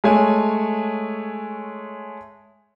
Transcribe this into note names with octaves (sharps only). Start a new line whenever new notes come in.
G#3 A3 C#5 G#5